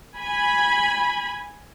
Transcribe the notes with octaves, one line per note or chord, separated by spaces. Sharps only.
G#5 B5